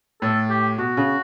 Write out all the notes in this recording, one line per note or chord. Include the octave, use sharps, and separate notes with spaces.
A2 A4
G4
B2 F#4
C#3